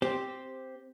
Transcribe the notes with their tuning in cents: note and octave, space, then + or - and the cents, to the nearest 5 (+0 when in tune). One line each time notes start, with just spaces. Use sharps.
C4 +0 G4 +0 C5 -5